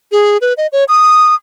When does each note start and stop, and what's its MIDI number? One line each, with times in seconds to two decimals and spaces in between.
0.12 0.37 68
0.41 0.53 71
0.57 0.67 75
0.72 0.84 73
0.88 1.35 87